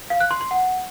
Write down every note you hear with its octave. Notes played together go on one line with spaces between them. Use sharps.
F5
F#6
C6
C6
F#5